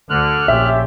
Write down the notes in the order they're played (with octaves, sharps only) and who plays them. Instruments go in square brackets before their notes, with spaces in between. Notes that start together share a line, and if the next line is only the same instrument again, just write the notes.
[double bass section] D2 [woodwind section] D3 [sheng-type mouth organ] F6 F#6
[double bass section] A#1 [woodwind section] C#4 F4 G4 [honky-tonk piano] E5